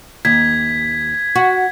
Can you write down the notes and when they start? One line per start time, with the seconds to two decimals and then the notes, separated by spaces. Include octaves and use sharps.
0.25 D#2 G#6 B6
1.36 F#4